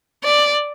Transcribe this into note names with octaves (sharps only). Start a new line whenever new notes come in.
D5